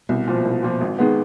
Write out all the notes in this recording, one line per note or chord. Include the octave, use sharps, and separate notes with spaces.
C2 B2
A#2 F3
C2
A#2 F3
G#1
D#3 G#3 B3